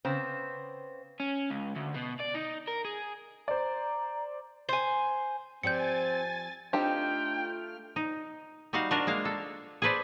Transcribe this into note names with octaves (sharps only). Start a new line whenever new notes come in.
C#3 B3 C4 C5
C#4
C#2
D2
B2
D5
D#4
A#4
G#4
C5 D5 A#5
C5 G#5
F3 C4 G4 D5 G#5 G6 A6 C#7
A3 C4 D4 D#4 F4 G4 G5 F6
D#4
G3 D#4 F#4 F5 F#5
D4 F4 F#4 A#4
G#3 A#3 F5
A4
G#4 A4 B4 C5 D5